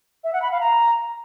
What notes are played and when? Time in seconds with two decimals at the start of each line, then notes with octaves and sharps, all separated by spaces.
0.24 E5
0.33 F#5
0.42 B5
0.51 F5
0.61 A#5